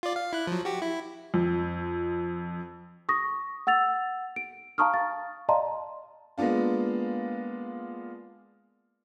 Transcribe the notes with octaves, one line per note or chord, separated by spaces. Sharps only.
F4 D5
F5
E4 F#6
F3 F#3
F#4 G4
E4
F2
C#6 D#6 A#6
F#5 E6 A6 F7
D7
F5 A5 A#5 C#6 D#6 F6
F5 A6
D5 D#5 F5 A5 A#5 C6
G#3 A#3 B3 D4 F4